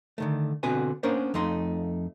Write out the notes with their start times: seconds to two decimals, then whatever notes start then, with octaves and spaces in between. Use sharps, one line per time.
0.18 D3 D#3 A3
0.63 B2 D3 C4 F#4 B4 G#5
1.03 A#3 B3 C#4 D4 A#4 C5
1.34 F2 A3 D#4 C6